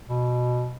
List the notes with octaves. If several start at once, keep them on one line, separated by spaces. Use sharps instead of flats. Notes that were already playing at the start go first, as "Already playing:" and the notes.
B2